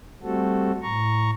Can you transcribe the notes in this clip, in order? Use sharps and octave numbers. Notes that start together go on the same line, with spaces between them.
G3 A3 C4 F#4 A4
A2 A#5 C#6